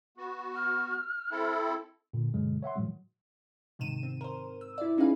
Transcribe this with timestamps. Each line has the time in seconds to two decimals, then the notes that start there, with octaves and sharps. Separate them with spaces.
0.18 B3 F#4
0.56 F6
1.31 C4 E4 A4
2.13 A#2 D3
2.34 G2 B2 D3 F#3 G#3
2.63 C#5 E5 F#5 C6
2.75 A2 D#3 F3 F#3 G#3
3.79 G#2 C3 D#3 D#7 E7
4.03 C4
4.21 A#4 C5
4.61 E6
4.78 E4 D5
4.97 C#4 D#4 G#4 B4 F5